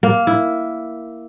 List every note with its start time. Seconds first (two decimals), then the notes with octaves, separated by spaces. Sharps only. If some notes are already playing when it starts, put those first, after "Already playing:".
0.03 A#3
0.27 E4